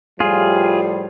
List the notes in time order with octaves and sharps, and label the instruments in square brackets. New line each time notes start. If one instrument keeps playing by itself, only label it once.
[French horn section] A2 F3 G3 [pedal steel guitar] F4 G#4